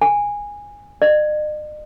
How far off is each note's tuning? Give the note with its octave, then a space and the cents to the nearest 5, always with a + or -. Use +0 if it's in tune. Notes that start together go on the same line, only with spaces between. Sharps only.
G#5 -15
D#5 -45